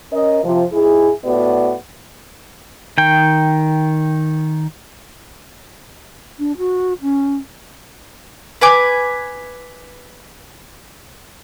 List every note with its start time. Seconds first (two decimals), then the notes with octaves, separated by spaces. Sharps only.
0.12 C#4 A#4 D#5
0.44 C3 F3
0.73 G#2 E4 G#4
1.25 A2 B3 F#4 D5
2.98 D#3 G5
6.39 D4
6.58 F#4
7.02 C#4
8.61 B4 G#5 D6